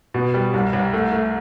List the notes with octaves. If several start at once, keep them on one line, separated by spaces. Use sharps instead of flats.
B2
G3
C2
C2
A3
A3